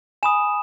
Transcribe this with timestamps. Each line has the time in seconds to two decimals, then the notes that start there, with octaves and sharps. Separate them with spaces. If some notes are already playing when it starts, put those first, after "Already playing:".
0.23 G#5 B5 D#6 E7